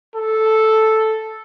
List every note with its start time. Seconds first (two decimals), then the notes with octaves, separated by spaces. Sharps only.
0.15 A4